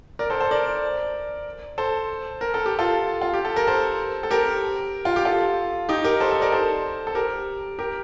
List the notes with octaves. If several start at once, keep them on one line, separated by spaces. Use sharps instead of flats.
A#4 D5
A4 C5
A4 C5
A#4 D5
A4 C5
A#4
A4
G4
F4 A4
F4
G4
A4
A#4
A4 C5
A4
G4 A#4
F4
G4
F4 A4
D#4 G4
G4 A#4
A4 C5
A4 C5
A#4 D5
A4 C5
A4
G4 A#4
G4 A#4